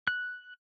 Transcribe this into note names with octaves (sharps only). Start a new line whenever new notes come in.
F#6